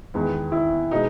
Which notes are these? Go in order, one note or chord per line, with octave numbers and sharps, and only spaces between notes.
E2 D#3 G#3 B3
E4
B2 G#3 D#4